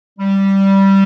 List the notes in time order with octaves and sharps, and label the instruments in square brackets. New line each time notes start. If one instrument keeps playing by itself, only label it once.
[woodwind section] G3